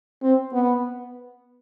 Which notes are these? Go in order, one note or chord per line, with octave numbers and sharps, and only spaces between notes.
C4
B3